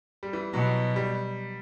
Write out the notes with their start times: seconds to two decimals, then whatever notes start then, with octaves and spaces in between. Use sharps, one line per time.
0.23 G3
0.33 E3
0.54 B2 F#3
0.96 G3